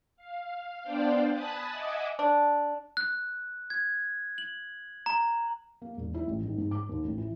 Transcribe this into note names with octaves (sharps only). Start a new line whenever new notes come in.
F5
B3 D4 C5 D5 F5 G5
G#5 A5 B5 D#6 F#6 A6
D#5 E5 F#5 G#5 D6 E6
D4
F#6
G#6
F#7
A#5
A#3
E1
E4
A1
G#1
G#2
D6
D#2
A1
E3